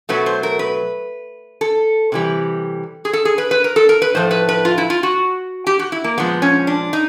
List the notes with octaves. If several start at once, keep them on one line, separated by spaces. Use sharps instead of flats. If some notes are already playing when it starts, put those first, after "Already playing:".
B2 F#3 A3 B4
C5
A#4
B4
A4
C3 E3 G3
G#4
A4
G#4
B4
B4
A#4
A4
A#4
B4
A2 F3 A3 C5
B4
B4
F4
E4
F4
F#4
G4
F#4
E4
A#3
A#2 F3 G#3 B3
C#4
D4
D#4